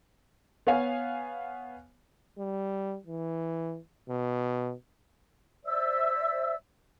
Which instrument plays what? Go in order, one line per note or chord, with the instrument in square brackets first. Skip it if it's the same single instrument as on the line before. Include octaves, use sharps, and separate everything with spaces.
[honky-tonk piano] B3 C#5 F5 G#5
[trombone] G3
E3
B2
[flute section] C5 D5 E5 E6